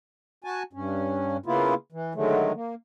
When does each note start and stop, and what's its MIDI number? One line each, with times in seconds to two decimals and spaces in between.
0.44 0.63 66
0.44 0.63 80
0.44 0.63 81
0.73 1.37 43
0.73 1.37 61
1.46 1.74 49
1.46 1.74 58
1.46 1.74 59
1.46 1.74 64
1.46 1.74 65
1.92 2.14 52
2.15 2.52 50
2.15 2.52 51
2.15 2.52 54
2.15 2.52 56
2.15 2.52 57
2.55 2.75 58